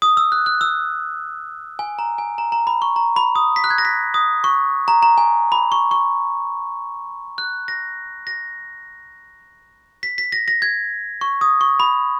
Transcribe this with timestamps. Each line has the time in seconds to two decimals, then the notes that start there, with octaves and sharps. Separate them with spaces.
0.02 D#6
0.17 E6
0.32 F#6
0.46 F#6
0.61 E6
1.79 G#5
1.99 A#5
2.18 G#5
2.38 A#5
2.52 A#5
2.67 B5
2.82 C#6
2.96 A#5
3.16 B5
3.36 D#6
3.56 B6
3.64 F#6
3.70 G#6
3.78 A#6
3.85 B6
4.14 D#6
4.44 C#6
4.88 A#5
5.03 A#5
5.18 G#5
5.52 B5
5.72 C#6
5.91 C#6
7.38 F#6
7.68 A#6
8.27 A#6
10.03 B6
10.18 B6
10.32 A#6
10.48 A#6
10.62 G#6
11.21 C#6
11.41 D#6
11.61 C#6
11.80 B5